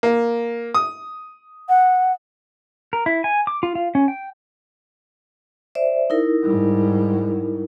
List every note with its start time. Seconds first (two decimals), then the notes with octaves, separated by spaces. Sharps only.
0.03 A#3
0.74 D#6
1.69 F#5
2.93 A#4
3.06 E4
3.24 G#5
3.47 D6
3.63 F4
3.75 F4
3.95 C#4
4.08 G5
5.75 C5 D5 E5
6.10 D#4 E4 A#4
6.43 G#2 G3